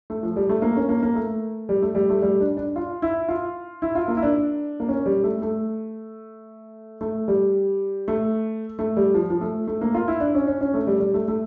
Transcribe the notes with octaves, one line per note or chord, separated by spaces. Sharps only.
A3
F3
G3
A3
A#3
C#4
A#3
A#3
A3
G3
A3
G3
A3
G3
D4
D4
F4
E4
F4
E4
F4
A#3
E4
D4
A#3
C#4
G3
A3
A3
A3
G3
A3
A3
G3
F3
F3
A3
A3
A#3
F4
E4
D4
C#4
C#4
C#4
A3
G3
G3
A3
A3